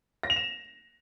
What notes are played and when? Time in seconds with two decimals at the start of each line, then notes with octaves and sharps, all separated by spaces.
0.23 A#6
0.30 F7
0.36 E7